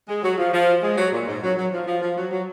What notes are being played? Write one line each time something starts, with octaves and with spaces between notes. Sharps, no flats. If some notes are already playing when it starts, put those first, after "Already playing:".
G#3
F#3
F3
F3
G#3
F#3
A#2
G#2
F#3
F#3
F3
F3
F3
F#3
F#3